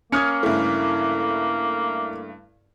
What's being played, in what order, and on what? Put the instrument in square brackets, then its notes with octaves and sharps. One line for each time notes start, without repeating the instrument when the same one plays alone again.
[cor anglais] A#3 [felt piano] C#4 D#6 G#6 [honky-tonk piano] F6 C#7
[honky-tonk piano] G2 C#3 A3 [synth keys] E4